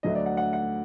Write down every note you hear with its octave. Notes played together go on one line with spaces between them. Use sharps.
D2 D3 F#3 A3 D#5
D5
F#5
F#5
F#5